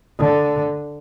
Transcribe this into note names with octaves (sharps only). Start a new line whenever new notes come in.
D3